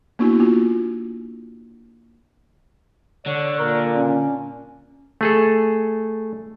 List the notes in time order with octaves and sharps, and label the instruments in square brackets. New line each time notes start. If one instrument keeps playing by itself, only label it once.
[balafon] A#3 B3 D4 E4 F#4
A#3 F4 F#4
[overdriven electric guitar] D3 [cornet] C#5
[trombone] A#2 [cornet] A#4
[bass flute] C#4 [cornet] D4
[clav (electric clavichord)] A3 G#4 A4